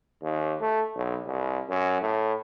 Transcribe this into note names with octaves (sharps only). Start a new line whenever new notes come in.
D#2
A3
B1
C2
F#2
A2